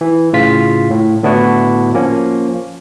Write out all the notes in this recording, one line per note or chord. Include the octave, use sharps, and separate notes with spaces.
E3
A2 C#3 F4 B6
A2
A2 D3 B3 D4 E4 F#4
F3 A#3 C#4